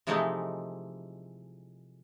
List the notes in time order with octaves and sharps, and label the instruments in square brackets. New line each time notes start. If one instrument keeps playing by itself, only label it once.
[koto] C3 E3 F3 G#3 A3 D#4